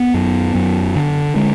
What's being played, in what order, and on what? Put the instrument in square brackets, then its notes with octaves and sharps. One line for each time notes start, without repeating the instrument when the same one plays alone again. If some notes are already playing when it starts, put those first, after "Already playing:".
Already playing: [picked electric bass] B3
F#2
F#2
D3
D3 G#3